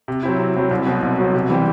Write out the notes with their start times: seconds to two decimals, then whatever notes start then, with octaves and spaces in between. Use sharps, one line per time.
0.08 C3
0.23 F#3 C4 E4
0.40 C3
0.55 F#3 C4 E4
0.71 C2
0.87 B2 F#3 C4
1.02 C2
1.18 B2 F#3 C4
1.34 C3
1.50 E3 G3 C4 G4